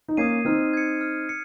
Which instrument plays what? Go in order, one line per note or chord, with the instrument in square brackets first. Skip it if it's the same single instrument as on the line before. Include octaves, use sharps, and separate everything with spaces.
[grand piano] D#4
[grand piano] A#3 C#4 [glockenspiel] D#6 G#6 C7 D#7
[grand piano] C4 D#4 [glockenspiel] F6
[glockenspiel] G#6 C#7
F6
C#7